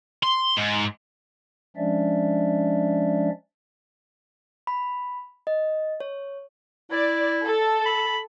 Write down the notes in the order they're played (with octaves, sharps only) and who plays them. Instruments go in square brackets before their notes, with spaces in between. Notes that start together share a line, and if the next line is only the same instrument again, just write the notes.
[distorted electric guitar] C6
G#2
[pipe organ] F3 G#3 C#4 D4 D5 E5
[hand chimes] B5
D#5
C#5
[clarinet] E4 [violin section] D5
[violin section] A4
[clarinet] B5